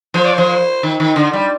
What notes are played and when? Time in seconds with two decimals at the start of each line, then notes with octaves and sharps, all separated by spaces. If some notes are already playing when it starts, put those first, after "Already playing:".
0.14 F3 C5
0.25 D5
0.34 F3 C5
0.83 D#3
1.00 D#3
1.16 D3
1.33 G3